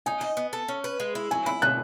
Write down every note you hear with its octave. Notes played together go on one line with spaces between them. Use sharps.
D#4 G#5
D#5
B3
A4
C#4
B4
G#3
E4
F#3 G#5
E4 B5
B2 F#6